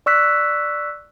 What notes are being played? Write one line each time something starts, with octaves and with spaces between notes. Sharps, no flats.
D5 C#6 E6 F#6 B6